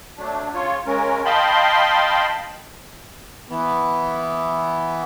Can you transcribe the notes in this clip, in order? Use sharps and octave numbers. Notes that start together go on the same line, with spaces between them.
F#3 A3 D4
C#3 F4 C#5
C#3 G#3 C#4 A#4
D#5 F5 G5 A5 B5 C6
E3 B3